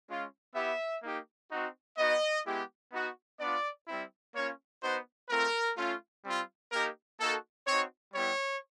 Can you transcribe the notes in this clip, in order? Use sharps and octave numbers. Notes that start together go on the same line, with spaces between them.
G#3 C#4 F4
B3 E4 G4 E5
A#3 D#4 G4
C4 D#4 F#4
B3 D#4 F#4 D#5
G#3 B3 E4 G4
B3 D#4 F#4
B3 D4 F4 D5
G3 C4 E4
A#3 C#4 F4 C#5
B3 D#4 F#4 C5
A3 C4 F4 A#4
A3 C#4 F4
G3 C4 F4
A#3 D#4 G4 A#4
A#3 D#4 F#4 A4
C4 D#4 F#4 C#5
G3 B3 E4 G4 C#5